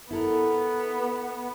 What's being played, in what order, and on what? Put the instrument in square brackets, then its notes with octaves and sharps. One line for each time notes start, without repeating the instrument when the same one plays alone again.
[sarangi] B3 [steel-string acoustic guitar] E4 A4 A#4